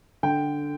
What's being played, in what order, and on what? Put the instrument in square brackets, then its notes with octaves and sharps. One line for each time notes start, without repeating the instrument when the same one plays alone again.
[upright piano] D3 G5